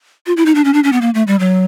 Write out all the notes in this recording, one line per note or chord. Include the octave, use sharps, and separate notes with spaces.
F4
E4
D#4
D4
C#4
D4
C#4
B3
A#3
A3
G3
F#3